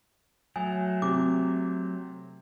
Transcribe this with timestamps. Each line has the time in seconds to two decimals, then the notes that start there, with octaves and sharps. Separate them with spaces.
0.56 F#3 A3 G#5
1.02 C3 D6